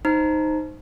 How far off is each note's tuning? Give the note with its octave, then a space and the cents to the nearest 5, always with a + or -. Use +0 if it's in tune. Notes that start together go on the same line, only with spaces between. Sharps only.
D#4 +0 C5 +0 A#5 +0